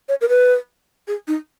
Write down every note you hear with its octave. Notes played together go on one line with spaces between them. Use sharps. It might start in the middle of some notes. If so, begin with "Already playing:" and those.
C#5
A#4
B4
G#4
D#4